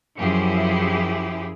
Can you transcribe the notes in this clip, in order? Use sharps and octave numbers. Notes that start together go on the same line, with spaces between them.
F#2 F3 E4 G4 G#4